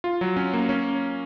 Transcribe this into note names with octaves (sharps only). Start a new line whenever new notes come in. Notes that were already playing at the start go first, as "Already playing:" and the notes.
F4
F#3
C#4
A#3
C#4